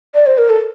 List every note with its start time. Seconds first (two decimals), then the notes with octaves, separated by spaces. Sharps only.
0.15 D5
0.26 C5
0.38 A#4
0.50 A4